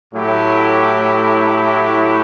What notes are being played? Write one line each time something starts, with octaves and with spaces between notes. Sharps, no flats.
A2 F#3 A3 E4 G4